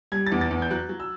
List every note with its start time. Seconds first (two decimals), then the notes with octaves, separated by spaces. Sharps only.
0.12 G3 G#6
0.26 A6
0.32 E2
0.41 A6
0.51 E2
0.62 G6
0.71 F#3 F#6
0.89 F#3
1.00 E6